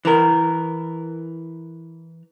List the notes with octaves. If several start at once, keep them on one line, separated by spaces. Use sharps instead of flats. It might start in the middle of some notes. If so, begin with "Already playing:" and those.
E3 A#4